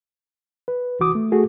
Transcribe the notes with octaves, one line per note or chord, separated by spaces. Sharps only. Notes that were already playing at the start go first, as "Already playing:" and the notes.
B4
C2 E3 F#4 D6 D#6
A3
A3 F#4 G#4 A4